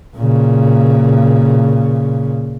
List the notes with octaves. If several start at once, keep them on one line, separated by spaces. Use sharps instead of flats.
A#2 C#3